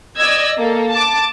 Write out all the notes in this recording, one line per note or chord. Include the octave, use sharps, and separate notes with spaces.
D5 D#5 E6 G#6
A#3 A4
A5 D6